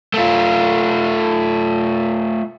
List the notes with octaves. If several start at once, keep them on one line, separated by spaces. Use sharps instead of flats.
A3 F4